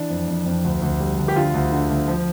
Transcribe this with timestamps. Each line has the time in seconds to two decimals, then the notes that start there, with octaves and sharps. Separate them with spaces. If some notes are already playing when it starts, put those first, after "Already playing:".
Already playing: E3 D4
0.10 F2
0.28 F2
0.46 F2
0.64 D2
0.82 D2
1.00 G3
1.18 D2
1.28 G4
1.36 D3 F4
1.54 D2
1.72 D3
1.90 D2
2.08 F3